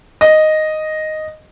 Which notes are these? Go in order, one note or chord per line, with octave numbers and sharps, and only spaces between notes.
D#5